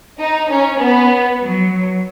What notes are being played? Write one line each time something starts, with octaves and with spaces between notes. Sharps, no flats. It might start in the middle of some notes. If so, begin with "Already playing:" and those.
D#4
C#4
B3
F#3